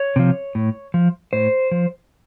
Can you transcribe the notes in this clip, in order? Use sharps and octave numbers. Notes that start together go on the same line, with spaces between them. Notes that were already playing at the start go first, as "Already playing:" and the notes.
Already playing: C#5
C3 F3
A2
F3
A2 C5
F3